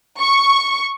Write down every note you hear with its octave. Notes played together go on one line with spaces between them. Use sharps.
C#6